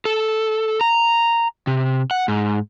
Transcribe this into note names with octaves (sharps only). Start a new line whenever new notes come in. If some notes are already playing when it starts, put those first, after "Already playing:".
A4
A#5
C3
F#5
G#2